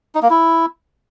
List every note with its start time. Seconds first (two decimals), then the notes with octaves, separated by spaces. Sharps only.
0.15 D#4
0.23 A#3
0.30 E4